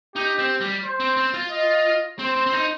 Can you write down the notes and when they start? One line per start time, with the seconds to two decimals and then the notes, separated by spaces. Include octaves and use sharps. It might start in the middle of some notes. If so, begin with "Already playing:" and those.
0.16 D#4 G4
0.39 C4
0.60 G3
0.84 C5
1.00 C4
1.17 C4
1.34 F4
1.51 D#5
2.19 C4 C5
2.36 C4
2.46 C4
2.53 D#4